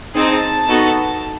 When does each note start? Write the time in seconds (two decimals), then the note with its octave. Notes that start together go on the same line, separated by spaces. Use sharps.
0.14 C4 D#4 G#4 A5
0.68 B3 D#4 F#4 A4